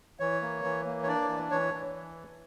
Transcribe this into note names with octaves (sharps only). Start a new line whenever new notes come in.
E3 C#5
A#3
E3
A#3
C#5
D4 D5
E3
E3 C#5
E3